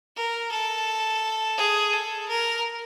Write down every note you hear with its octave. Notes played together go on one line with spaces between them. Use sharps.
A#4
A4
G#4
A4
A#4